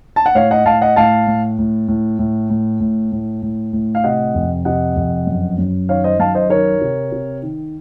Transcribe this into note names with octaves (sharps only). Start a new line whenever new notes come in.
A5
F#5
A2 C#5 F5
D#5 F#5
A2 F5 A5
D#5 F#5
A2 F5 A5
A2
A2
A2
A2
A2
A2
A2
A2
A2
F5
C3 D#5 F#5
F2
C3 D#5 F#5
F2
F#2
F#2
D#3 C#5 F5
C5 D#5
F#2 F5 A5
C5 D#5
D#3 A#4 C#5
C3
C3
D#3